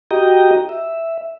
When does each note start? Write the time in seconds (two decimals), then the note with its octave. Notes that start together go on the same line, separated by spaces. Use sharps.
0.11 F#4 G4 D#5 G5 A#5
0.69 E5